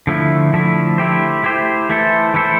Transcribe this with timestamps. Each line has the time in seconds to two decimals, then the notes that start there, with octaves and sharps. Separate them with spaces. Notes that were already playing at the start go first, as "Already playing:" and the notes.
0.07 D3 F3 A3 E4
0.53 D3 F3 A3 E4
0.98 A3 E4 G4 C5
1.43 A3 E4 G4 C5
1.89 E3 A3 E4 A4 C5
2.34 E3 A3 E4 A4 C5